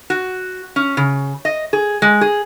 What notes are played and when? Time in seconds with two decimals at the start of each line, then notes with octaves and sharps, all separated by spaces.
0.10 F#4
0.76 C#4
0.97 C#3
1.45 D#5
1.73 G#4
2.02 G#3
2.21 G#4